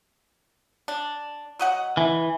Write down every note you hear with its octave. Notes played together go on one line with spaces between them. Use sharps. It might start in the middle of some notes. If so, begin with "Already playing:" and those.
D4
F#3 D#5 F#5
E3